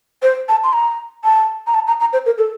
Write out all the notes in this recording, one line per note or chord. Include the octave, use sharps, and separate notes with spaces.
C5
A5
C6
A#5
A5
A#5
A5
A#5
A#5
C5
A#4
A4